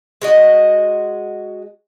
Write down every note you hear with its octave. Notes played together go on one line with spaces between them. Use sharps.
G#3 F#4 D#5